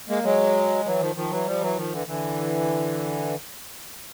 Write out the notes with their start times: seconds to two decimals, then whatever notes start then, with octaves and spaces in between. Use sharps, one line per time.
0.09 G#3 A#3
0.23 F#3 G#3
0.85 E3 F#3
1.00 D#3 F3
1.16 D#3 F3
1.31 E3 F#3
1.46 F3 G3
1.61 E3 F#3
1.76 D#3 F3
1.92 D3 E3
2.07 D3 E3